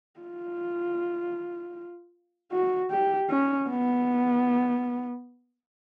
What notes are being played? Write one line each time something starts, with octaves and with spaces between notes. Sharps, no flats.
F4
F#4
G4
C#4
B3